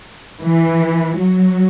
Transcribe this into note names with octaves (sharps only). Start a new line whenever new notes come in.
E3
F#3